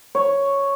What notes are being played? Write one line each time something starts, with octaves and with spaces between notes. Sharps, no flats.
C#5